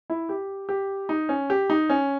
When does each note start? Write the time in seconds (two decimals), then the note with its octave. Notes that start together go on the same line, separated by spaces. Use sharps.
0.10 E4
0.29 G4
0.69 G4
1.09 D#4
1.29 C#4
1.50 G4
1.70 D#4
1.90 C#4